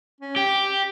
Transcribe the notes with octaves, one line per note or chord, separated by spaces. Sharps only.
C#4
G4 G5